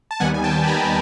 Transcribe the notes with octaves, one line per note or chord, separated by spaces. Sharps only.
A5
D#2 D#3 G3 B3 F#5 G#5
G#5
G5 A5
B5
G#5 A#5